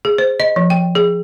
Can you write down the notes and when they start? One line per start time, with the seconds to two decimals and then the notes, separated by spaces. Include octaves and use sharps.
0.05 G#4
0.18 C5
0.40 D#5
0.56 F3
0.70 G5
0.95 G#4